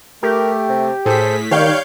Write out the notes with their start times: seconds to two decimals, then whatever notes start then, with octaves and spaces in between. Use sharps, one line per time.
0.23 A3 G4 A#4
0.69 C3
1.06 A2 G#4 A4 C5 B6
1.51 D#3 G3 C#5 F5 G5 F#6 G6